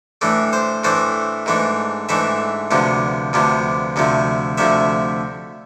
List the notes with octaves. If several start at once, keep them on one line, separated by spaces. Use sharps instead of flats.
A2 E3 A3 D4
C5
A2 E3 A3 D4 C5
G#2 E3 A3 D4
G#2 E3 A3 D4 E5
D2 C3 F3 B3 D4
D2 C3 F3 B3 D4
D2 C3 F3 A3
D2 C3 F3 A3 E5